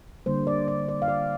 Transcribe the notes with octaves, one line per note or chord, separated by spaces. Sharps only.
D3 G3 A#3 C5
D5
D5
D5
F5
D5